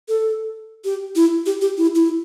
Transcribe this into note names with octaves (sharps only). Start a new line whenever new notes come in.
A4
G4
E4
G4
G4
E4
E4